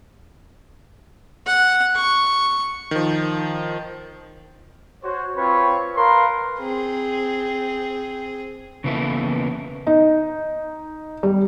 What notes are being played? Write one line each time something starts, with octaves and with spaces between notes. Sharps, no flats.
F#5
C#6
D#3 F3
F#4 C5 C#5
C4 F4 B4 C#5
A#4 B4 F5 C6
C4 G#4
C#3 E3 A#3 B3 E4 A4
D#4
G3